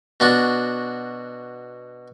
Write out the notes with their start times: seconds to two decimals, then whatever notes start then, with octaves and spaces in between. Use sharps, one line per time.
0.20 B2 D4 F#4